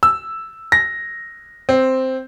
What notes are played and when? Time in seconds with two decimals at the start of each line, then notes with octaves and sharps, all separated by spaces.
0.03 E6
0.72 A#6
1.69 C4